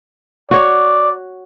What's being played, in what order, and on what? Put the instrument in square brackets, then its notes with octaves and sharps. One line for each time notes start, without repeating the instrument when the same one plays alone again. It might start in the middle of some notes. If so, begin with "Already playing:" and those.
[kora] F#4 C#5 [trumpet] D5